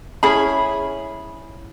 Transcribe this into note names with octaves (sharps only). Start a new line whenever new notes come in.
C#4 E4 G#4 B5